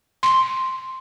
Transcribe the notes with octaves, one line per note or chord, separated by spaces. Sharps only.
C6